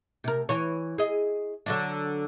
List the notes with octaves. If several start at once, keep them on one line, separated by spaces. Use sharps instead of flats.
C3 A#4
E3 C#5
G#4 D#5
D3 F#3 D4